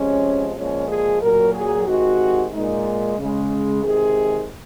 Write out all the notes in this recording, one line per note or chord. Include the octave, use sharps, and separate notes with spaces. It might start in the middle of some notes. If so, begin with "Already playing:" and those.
Already playing: C3 F3 G#3 C#4
A#2 F3 G#3 C#4
G#4
A#2 F#3 A#4
G#4
C3 D#3 G#3 F#4
A#2 G#3 D#4
C#3 G#3
C3 D#3 G#3 G#4